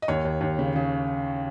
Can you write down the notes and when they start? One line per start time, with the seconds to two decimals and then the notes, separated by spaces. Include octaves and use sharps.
0.02 D#5
0.08 D#2 C#5
0.25 D#2
0.41 D#2
0.59 C#3
0.76 C#3